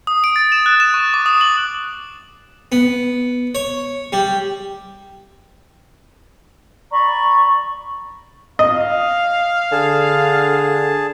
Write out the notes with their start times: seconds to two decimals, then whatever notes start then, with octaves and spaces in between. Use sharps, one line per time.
0.07 D#6
0.24 D7
0.36 A6
0.52 E7
0.66 F#6
0.80 E7
0.94 C#6
1.14 D6
1.26 D#6
1.41 F#7
2.72 B3
3.55 C#5
4.13 G3
6.91 D5 A#5 B5 C#6
8.59 D#5 F5
9.72 D3 G#4 A5